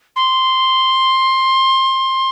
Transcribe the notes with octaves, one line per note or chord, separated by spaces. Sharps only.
C6